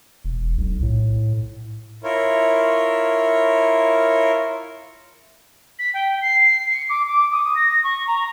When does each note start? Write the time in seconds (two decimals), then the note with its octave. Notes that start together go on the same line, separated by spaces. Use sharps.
0.25 E1
0.58 B1
0.83 A2
2.04 E4 F4 A#4 C#5
5.79 B6
5.94 G5
6.21 C7
6.71 C#7
6.89 D6
7.06 D6
7.32 D#6
7.55 A#6
7.84 C#6
8.07 A#5